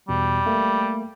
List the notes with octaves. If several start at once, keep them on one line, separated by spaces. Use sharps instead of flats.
E2 B2 G3
A3 A#3